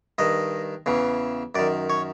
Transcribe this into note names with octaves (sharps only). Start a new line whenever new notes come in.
G2 D#3 D#5
E2 C#3 E3
F#2 D#3 D5
C#5